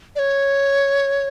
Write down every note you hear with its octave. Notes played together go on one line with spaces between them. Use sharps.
D5
C#5